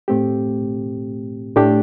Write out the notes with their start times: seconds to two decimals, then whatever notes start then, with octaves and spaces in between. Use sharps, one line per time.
0.08 A2 A3 C4 G4
1.56 A2 A3 D4 G4